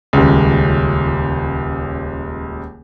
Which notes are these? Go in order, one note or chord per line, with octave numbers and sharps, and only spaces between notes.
D#1 C#2